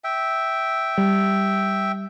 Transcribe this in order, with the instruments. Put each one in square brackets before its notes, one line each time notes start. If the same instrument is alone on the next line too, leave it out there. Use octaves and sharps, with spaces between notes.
[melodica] E5 G5
[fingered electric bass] G3